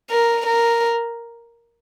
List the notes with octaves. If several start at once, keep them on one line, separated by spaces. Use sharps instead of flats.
A#4
A#4